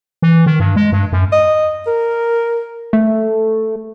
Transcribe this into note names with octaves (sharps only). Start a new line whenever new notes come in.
E3
D#3
G2
G#3
G2
F#2
D#5
A#4
A3